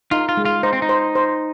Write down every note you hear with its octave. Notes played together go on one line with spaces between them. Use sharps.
D#4 F4
F4
G#3
F4
D#4 C5
C4
D#4
C5
C5